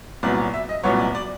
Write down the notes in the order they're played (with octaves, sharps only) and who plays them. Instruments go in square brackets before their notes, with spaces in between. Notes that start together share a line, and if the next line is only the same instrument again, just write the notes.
[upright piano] C2 A#2 F#3 B3 D5
E5
D#5
C2 A#2 F#3 B3 C#5
D5
D5